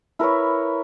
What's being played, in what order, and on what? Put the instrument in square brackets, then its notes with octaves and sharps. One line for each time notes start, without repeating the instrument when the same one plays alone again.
[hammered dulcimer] E4 A#4 B4 C#5